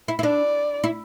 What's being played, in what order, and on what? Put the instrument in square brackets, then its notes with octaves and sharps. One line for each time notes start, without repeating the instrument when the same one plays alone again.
[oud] E4
E4
[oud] D4 [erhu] D5
[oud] E4